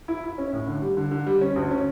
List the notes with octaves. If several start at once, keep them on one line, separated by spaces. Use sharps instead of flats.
E4
E4
C#4
A2
D3
G3
D3
D3
G3
C#4
D2
C#4